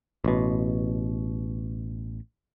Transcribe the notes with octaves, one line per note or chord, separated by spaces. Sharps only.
A1 B2